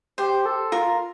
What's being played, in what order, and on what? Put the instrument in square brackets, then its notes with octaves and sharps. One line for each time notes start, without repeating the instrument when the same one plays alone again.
[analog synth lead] G4 [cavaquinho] C5
[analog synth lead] A4
[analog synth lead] F4 [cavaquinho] A#4